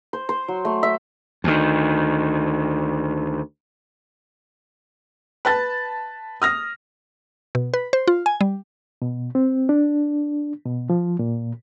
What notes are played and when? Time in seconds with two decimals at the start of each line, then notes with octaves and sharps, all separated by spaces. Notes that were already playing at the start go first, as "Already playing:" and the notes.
0.13 C5
0.29 C5
0.48 F#3
0.65 A3
0.83 E5
1.44 D2 D#3
5.45 B4 A5 A6
6.42 D#6 F6 A#6
7.55 B2
7.74 B4
7.93 C5
8.08 F4
8.26 G#5
8.41 G3
9.02 B2
9.35 C4
9.69 D4
10.65 B2
10.90 F3
11.19 A#2